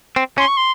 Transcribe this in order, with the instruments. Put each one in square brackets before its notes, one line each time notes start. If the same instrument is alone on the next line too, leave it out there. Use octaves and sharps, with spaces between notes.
[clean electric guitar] C4
[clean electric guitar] C#4 [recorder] C6
[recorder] C#6
C6